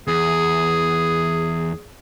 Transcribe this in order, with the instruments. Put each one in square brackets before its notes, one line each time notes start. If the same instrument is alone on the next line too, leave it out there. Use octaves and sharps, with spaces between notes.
[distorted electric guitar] E2 [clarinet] G#4